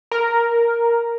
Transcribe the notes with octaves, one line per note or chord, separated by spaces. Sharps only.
A#4